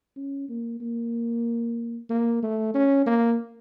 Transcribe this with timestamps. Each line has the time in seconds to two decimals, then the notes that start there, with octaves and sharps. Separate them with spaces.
0.16 C#4
0.49 A#3
0.81 A#3
2.10 A#3
2.42 A3
2.74 C#4
3.06 A#3